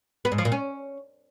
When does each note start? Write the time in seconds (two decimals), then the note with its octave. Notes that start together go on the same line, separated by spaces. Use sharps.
0.25 B3
0.32 G#2
0.38 F3
0.45 A#2
0.52 C#4